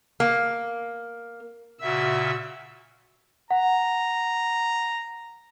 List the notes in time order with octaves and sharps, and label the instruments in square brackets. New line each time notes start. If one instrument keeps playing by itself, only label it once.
[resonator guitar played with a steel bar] A#3
[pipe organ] A#2 C#3 E5 [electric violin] F#4 E6
[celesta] F#5 [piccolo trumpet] A#5